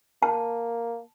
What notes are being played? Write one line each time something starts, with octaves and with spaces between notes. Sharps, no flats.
A#3 A5